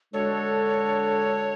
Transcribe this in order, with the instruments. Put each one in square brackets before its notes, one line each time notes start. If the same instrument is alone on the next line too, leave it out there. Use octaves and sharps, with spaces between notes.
[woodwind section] D3 G#3 D4 F#4 A4 [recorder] C#5